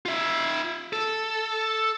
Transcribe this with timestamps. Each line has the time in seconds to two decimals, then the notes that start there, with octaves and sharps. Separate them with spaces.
0.06 F4 E5
0.93 A4